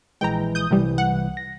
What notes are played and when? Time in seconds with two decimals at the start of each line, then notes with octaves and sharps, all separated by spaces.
0.21 A#1 E3 G#3 G5 A#5
0.55 D#6 G6
0.71 C2 C3 E3 G3
0.98 F#5
1.37 A#6